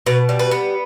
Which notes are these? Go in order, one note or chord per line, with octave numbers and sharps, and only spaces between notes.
B2 B4
G3
B4
B3